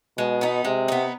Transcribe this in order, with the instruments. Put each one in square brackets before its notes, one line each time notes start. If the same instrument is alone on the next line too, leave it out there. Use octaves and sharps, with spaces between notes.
[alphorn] B2 [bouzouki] G#3
[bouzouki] B3 D#4
[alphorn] C3 [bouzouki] G#3
[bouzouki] B3 D#4